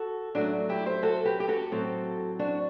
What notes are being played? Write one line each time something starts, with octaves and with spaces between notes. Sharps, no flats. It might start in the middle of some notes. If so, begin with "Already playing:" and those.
Already playing: F#4 A4
A2 F#3 A3 D4 F#4
E4 G4
C5 E5
F#4 A4
G4 B4
G4
F#4 A4
A2 F#3 C4
D4 F#4